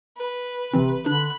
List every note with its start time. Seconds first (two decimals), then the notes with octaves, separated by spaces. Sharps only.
0.17 B4
0.73 G1 C3 E3 C4
1.06 D3 D4 B5 F#6